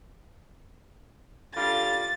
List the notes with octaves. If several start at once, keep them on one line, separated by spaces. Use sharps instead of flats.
D3 G3 F4 A6